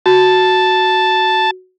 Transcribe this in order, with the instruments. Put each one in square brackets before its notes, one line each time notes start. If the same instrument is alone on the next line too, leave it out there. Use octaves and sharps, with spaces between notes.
[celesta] F#4 [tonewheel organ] A5